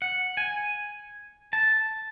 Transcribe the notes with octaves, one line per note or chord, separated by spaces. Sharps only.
F#5
G#5
A5